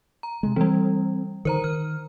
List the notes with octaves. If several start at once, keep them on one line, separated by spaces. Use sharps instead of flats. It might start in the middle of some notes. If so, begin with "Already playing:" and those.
A#5
C3 G#3
E3 G3 C4
D3 D#3 A#4 C5 A#5
D#3 F6